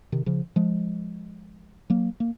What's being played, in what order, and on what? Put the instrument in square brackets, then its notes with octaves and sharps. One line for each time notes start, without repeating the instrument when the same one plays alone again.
[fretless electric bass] C3 D#3
C#3 F3
F3 G#3
F#3 A#3
A#3